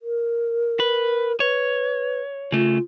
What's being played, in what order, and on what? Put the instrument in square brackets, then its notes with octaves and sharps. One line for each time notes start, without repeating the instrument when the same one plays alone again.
[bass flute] A#4
[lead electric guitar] B4
[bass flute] B4 [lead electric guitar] C#5
[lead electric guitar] C#3 A3 [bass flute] F4